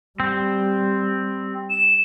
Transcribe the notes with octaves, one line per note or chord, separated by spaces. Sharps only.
G3 C4
E7